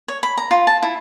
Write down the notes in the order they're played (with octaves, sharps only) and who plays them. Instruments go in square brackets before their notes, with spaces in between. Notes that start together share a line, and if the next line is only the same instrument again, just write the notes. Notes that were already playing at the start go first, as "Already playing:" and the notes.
[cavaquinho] C#5
B5
A#5
F4
A5
E4